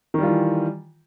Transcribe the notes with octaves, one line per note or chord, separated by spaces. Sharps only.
D#3 E3 G3 F4